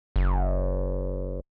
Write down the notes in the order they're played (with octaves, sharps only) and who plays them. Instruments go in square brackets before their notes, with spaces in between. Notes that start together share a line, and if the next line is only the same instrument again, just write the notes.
[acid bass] F#1